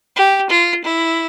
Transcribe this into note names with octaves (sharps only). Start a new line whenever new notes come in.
G4
F4
E4